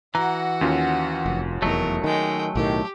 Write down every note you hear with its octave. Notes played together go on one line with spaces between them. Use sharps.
E3 F#4 F#5 A#5
D#2 C#4 F4
F1
F1 E2 F#3 A3 D#4 A#4
D#3 G#3 G5
B1 A2 D#3 G4